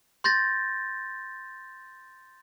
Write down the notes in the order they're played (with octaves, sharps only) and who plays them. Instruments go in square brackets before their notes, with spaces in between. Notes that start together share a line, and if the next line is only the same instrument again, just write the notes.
[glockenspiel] C6 G6 A6 A#6